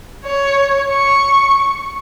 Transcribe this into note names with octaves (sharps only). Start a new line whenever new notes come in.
C#5
C#6